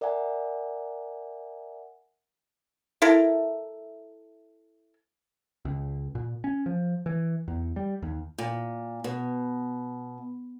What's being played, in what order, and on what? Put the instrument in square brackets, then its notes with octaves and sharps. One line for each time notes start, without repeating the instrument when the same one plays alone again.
[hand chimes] A#4 D5 E5 F#5 G#5 A#5
[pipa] E4 A4 A#4
[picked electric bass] C#2
A#2
C#4
F3
E3
E2
G3
D#2
[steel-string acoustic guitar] A#2
B2